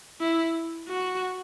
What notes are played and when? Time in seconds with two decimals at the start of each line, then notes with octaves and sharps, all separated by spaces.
0.20 E4
0.88 F#4